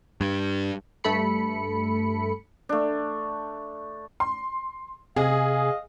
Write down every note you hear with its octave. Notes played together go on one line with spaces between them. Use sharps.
G2
G2 A3 A4 B5 C#7
A3 D4
C6
C3 G#4 D#5 F5